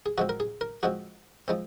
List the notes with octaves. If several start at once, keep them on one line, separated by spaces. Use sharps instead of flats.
G#4
F3 G#3 C4 F#4
A#4
G#4
A#4
F3 G#3 C4 F#4
F3 G#3 C4